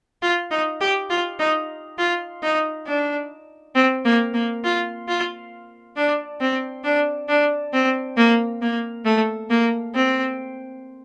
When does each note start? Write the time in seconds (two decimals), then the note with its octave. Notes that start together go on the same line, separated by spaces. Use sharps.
0.22 F4
0.51 D#4
0.81 G4
1.10 F4
1.40 D#4
1.98 F4
2.43 D#4
2.87 D4
3.75 C4
4.05 A#3
4.34 A#3
4.64 F4
5.08 F4
5.97 D4
6.41 C4
6.84 D4
7.29 D4
7.73 C4
8.17 A#3
8.62 A#3
9.05 A3
9.50 A#3
9.95 C4